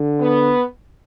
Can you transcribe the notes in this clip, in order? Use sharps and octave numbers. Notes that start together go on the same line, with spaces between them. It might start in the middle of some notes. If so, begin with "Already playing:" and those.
Already playing: D3
B3